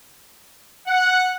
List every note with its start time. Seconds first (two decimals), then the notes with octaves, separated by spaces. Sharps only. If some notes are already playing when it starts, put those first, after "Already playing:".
0.87 F#5